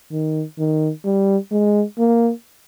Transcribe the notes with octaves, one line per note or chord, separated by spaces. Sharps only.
D#3
D#3
G3
G#3
A#3